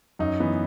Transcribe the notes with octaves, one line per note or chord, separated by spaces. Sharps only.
F#2 D#4
E3 B3